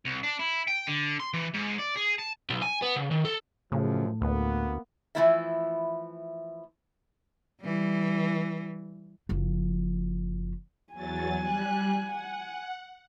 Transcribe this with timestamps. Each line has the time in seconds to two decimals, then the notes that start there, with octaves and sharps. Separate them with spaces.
0.05 C2
0.23 D4
0.39 E4
0.67 G5
0.87 D3
1.20 C6
1.34 E3
1.54 G#2
1.79 D5
1.97 G#4
2.19 A5
2.50 B1
2.62 G#5
2.82 B3
2.96 C#3
3.11 D#3
3.25 A4
3.72 F#2 A2 C#3 F3
4.22 D2 A#3 B3
5.15 E3 F3 A3 E4 F4 E5
7.61 E3 G3
9.29 F#1 F3
10.93 E2 F#3 G#5 A6
11.41 G3 F#6
12.04 F#5